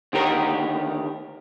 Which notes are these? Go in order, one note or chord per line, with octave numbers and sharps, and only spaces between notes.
D2 D#3 G4 A#4